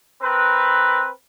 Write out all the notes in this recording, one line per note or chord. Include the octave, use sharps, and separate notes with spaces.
C4 A#4 B4